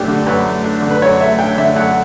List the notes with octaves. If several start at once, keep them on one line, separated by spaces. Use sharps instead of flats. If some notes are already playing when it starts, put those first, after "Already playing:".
Already playing: F#2 A3 D4 G4
D3
F#2 B4
A3
D4
D3
B4
F#2 C#5
A3 E5
D4 G5
D3 E5
F#2 F#5